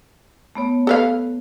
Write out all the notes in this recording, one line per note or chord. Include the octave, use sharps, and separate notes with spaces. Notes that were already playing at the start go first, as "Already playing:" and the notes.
A3 B3 C#5
A4 B4 F5